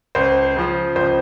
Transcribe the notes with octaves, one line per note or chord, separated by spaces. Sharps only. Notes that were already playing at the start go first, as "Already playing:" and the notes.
C#2 C5
C#3 F3
C#2 C5